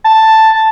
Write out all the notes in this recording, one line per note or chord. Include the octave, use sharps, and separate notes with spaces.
A5